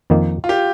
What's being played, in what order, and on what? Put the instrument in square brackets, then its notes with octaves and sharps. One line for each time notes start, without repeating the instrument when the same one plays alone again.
[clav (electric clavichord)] F2 D#3 A#3 D#4
[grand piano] F4
G4